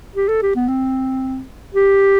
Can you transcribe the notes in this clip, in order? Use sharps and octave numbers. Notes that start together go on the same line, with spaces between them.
G4
A4
G4
B3
C4
G4